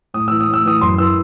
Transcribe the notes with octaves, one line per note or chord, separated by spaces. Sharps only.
A2 D#6
E3 E6
D#6
A2
E6
E3 D#6
F#2 C6
E3 E6